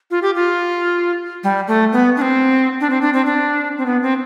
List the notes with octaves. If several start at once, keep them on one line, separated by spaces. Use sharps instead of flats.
F4
G4
F4
G3
A3
B3
D4
C4
D4
C4
D4
C4
D4
C4
B3
C4